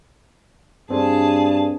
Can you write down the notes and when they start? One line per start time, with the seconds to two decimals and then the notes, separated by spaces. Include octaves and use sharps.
0.90 G2 C4 D4 G#4 A5